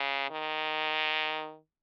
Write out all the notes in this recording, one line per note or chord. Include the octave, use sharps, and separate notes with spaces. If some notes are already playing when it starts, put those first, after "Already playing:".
Already playing: C#3
D#3